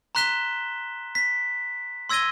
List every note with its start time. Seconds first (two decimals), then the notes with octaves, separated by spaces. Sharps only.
0.15 A#5 C6 F#6 B6 E7 G7
1.15 B6
2.09 C6 E6 G#6 A#6 D#7 G7